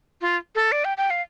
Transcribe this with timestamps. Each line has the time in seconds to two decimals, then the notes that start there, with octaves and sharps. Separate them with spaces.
0.21 F4
0.55 A4
0.72 D5
0.85 G5
0.97 G5
1.10 F5